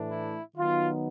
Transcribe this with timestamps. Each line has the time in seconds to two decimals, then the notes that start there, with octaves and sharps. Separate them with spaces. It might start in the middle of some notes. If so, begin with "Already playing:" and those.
Already playing: A2 E3 A3 D4
0.10 E4
0.56 D#3 F#3 B3 D#4 F4